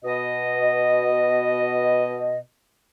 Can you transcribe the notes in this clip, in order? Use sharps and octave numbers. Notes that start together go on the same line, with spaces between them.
B2 D#5